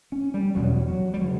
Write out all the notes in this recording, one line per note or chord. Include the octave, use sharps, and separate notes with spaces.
C#4
G3
E2 B2 F#3
F#3
G3
C#3 F#3